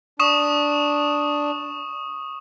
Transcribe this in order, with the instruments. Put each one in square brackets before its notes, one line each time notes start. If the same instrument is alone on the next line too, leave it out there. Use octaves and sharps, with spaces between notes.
[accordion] D4 [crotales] C#6 D#6 E7